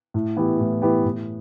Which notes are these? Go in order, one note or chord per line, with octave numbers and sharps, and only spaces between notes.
A2
E3 B3 E4 G4
A2
E3 B3 E4 G4
A2